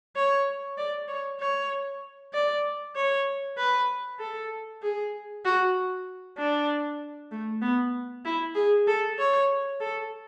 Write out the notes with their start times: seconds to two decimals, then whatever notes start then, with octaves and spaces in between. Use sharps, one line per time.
0.16 C#5
0.78 D5
1.08 C#5
1.40 C#5
2.33 D5
2.96 C#5
3.57 B4
4.19 A4
4.82 G#4
5.45 F#4
6.38 D4
7.31 A3
7.62 B3
8.25 E4
8.55 G#4
8.87 A4
9.18 C#5
9.81 A4